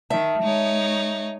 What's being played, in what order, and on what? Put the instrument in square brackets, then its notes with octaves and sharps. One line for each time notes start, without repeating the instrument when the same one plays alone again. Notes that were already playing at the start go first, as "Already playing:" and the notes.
[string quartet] D#3 [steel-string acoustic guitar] E5 A5
[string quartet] G#3 D#4 C#5